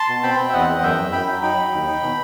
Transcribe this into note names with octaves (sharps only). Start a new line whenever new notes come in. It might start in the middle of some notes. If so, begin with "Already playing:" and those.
Already playing: A5 C6
B2
C4 G5 B5
C4
E5
E2 D#5 F#5
E2
F#2 E5 G5
F#2
F#2 G5 B5
F#3
D#4 G5 B5
D#4
D#2
D#4
B2